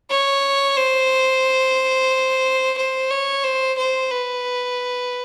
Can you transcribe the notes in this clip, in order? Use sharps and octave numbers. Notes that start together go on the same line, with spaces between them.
C#5
C5
C5
C#5
C5
C5
B4